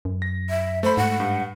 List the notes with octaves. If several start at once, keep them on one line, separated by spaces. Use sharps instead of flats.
F#2
A#6
E5
A3 C5 B5
G#2 F#5
G2